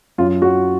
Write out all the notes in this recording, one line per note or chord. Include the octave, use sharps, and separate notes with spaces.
F#2 F4
F#3 F#4